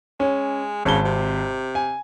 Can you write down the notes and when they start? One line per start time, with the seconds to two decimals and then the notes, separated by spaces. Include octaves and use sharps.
0.20 G#3 C#4
0.85 G#1 C#3 A5 G7
1.05 C3
1.75 G#5